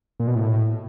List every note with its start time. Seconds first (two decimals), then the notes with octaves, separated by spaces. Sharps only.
0.20 A#2
0.27 B2
0.35 A2